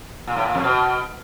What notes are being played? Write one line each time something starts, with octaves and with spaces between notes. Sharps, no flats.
A#2
A2
A#2
F2
B2